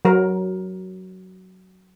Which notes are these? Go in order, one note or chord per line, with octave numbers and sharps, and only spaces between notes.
F#3 A#4